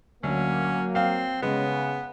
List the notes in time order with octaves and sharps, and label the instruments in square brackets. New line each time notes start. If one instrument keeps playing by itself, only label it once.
[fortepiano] D2 [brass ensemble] F#3 A#3 [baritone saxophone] C#4
[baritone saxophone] C4 [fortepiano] F5
[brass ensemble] C#3 [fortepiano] G#3 [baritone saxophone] B3